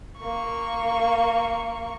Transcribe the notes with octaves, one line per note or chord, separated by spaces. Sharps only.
A#3 C#6